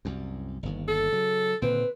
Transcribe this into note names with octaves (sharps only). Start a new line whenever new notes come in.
C2 F#2
G1 D#2
A4
C#3 F#3
A#2 D3 D#3 C4 B4